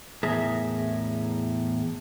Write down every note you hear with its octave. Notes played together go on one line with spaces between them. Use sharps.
E2 A2 G#4 A#4 E5